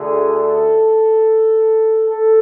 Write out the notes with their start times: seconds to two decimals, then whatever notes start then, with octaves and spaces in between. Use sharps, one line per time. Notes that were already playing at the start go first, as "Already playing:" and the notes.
Already playing: D2 D3 A3 G#4
0.36 A4
2.07 A4